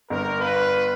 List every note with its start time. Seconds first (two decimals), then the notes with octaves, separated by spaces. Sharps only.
0.10 G1 A#4
0.40 F4 B4